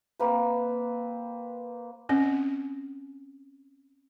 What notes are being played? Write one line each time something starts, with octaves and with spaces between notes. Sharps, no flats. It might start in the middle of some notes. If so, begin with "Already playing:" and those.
A#3 C4 B4
C4 C#4